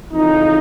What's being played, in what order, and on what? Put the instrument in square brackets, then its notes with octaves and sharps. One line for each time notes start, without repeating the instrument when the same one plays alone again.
[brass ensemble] F2 C#3 E3 D#4